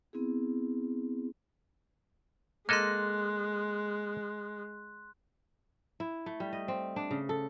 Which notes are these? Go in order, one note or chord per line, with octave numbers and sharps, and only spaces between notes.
B3 C4 E4 G#4
G#3 A#3 A4 D#5 C6 F#6
E4
A3
G3
D#5
C4
D4
C#3
A4